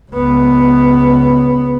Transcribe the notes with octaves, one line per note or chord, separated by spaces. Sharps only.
C#2 B3